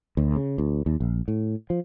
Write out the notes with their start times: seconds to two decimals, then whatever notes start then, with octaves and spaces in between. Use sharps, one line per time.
0.17 D2
0.36 C#3
0.58 D2
0.86 D#2
1.00 A#1
1.28 A2
1.70 F3